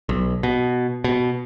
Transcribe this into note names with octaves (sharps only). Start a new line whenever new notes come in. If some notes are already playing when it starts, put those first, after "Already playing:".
B1
B2
B2